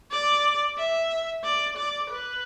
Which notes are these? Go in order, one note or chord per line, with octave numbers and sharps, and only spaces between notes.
D5
E5
D5
D5
B4